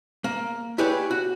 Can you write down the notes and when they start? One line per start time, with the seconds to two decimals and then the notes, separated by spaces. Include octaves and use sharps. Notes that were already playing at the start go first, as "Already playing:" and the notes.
0.24 A#3
0.78 E4 G4 G#4 B4 C#5 D5
1.11 F#4